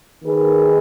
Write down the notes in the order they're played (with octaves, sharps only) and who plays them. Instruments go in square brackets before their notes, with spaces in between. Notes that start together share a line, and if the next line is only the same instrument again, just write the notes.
[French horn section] D#3 A#3 D#4 G#4 B4